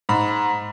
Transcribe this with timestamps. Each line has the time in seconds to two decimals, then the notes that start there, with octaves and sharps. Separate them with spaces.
0.09 G#2 B5